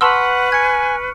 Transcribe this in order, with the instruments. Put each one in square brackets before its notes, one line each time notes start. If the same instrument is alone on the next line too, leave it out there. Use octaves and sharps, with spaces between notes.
[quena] B4 [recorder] F#5 [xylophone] A5 C6 E6 [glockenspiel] C#6 F6
[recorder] G#5 [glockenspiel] F#6 C#7 [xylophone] G#6